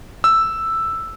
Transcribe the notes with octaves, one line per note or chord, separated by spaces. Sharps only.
E6